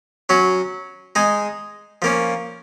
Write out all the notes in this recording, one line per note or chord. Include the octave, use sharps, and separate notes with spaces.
F#3 C#4 F#4
G#3 D#4 G#4
F3 A#3 C#4